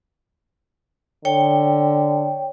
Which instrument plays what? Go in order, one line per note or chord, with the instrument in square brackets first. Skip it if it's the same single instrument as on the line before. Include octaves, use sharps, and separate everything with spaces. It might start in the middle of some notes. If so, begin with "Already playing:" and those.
[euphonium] D3 [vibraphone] C#5 G5